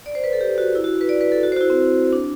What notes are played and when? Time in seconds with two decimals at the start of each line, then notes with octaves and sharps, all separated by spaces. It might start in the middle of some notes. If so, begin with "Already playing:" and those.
0.06 D5
0.15 C5
0.24 B4
0.33 A4
0.41 G4
0.58 F#4
0.75 E4
0.84 F#4
1.01 B4
1.09 D5
1.21 B4
1.32 A4
1.43 F#4
1.52 C5
1.56 F#4
1.61 E4
1.70 C4
2.13 D4